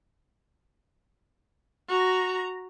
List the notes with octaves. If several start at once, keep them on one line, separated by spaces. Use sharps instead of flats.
F#4 A#5